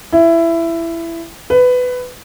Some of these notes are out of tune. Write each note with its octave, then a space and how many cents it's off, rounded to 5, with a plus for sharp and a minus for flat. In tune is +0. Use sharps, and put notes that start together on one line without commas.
E4 +15
B4 +15